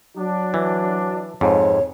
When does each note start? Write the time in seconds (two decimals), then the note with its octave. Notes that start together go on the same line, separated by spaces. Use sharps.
0.17 F#3 D4
0.54 E3
1.41 F2 G#2 C#5